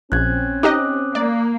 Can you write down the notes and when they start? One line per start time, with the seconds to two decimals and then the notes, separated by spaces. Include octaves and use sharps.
0.12 A#1 C4 C#4 F#6 G#6
0.63 D#4 G4 D#5 D6 D#6 F#6
1.15 A#3 D5